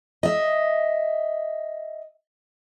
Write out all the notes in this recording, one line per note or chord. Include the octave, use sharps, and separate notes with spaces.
D#5 E5